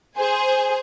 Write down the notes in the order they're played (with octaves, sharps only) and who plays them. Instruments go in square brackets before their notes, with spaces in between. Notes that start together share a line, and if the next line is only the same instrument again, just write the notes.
[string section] G#4 C5 G#5